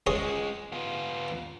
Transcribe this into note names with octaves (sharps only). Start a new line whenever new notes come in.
G#3 C#4 G#4 C#5
B3 F4